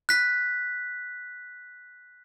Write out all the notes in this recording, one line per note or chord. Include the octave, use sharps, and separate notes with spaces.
F#6 B6